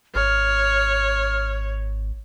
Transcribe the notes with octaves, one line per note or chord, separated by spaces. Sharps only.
G#1 C#5 F6